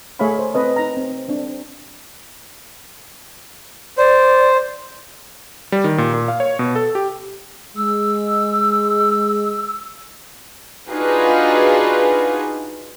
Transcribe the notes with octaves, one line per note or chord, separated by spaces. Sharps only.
A3 G#4 C#5 E5 F5 B5
C5
C4 B4 D#5 A5
D#4 A#5
C4
C4 D4
C5 D5
G3
D#3
A#2
A#2
F5
C#5
B2
A4
G4
G#3 E6
D4 D#4 F4 F#4 G#4 B4